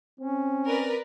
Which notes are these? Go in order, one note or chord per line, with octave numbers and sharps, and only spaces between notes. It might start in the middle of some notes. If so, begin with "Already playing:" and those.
C4 C#4
A#4 B4 D5